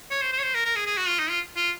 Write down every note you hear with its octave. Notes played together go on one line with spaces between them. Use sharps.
C#5
C5
C5
C#5
C5
A#4
A#4
G#4
G#4
F#4
F4
D#4
F4
F4